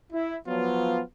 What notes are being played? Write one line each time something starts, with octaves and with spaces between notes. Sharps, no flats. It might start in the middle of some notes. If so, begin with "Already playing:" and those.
E4
F3 F#3 B3 F4